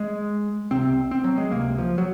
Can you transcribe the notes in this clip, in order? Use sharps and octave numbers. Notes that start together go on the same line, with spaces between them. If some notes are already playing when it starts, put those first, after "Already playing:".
Already playing: G#3
C2 C3 C4
C4
F#3
G#3
C#2 C3 A#3
F3
F#3